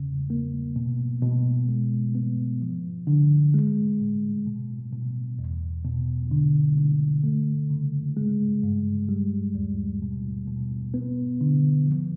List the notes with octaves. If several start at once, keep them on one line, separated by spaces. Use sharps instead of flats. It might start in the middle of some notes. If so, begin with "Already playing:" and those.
Already playing: E2 C#3
A#3
B2
B2
G#3
B3
F3
D3
G#3
A2
B2
B2
E2
B2
D3
D3
A3
C#3
G#3
G2
G3
D#2
B2
B2
B3
D3
F3